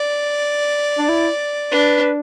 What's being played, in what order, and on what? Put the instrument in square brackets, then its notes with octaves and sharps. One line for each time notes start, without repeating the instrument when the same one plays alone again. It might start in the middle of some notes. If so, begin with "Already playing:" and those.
Already playing: [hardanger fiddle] D5
[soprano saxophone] D4
E4
[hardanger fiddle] D4 [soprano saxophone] B4